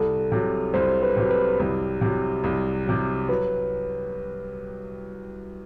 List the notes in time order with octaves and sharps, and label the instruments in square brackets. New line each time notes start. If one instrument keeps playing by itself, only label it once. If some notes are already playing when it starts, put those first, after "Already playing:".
Already playing: [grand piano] C2 [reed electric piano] A4
[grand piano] C3 F#3
[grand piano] C2 [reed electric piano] C5
[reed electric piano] B4
[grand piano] C3 F#3
[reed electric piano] B4
[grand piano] C2
C3 F#3
C2
C3 F#3
[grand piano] F#3 [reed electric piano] B4